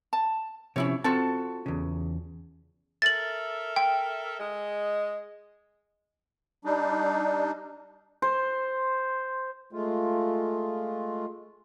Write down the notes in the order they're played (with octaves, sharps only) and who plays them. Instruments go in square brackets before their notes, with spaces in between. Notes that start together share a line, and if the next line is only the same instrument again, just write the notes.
[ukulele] A5
[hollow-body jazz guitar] C3 F3 [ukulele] C#4 E4 C#5
[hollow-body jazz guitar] C4 A5 [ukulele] F4 F#4 A4
[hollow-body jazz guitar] E2 C#3
[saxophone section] A4 A#4 E5 [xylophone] A6 F#7
[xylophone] G5
[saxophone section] G#3 D#5
[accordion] G3 D4 D#4
[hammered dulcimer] C5
[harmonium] G#3 A3 F4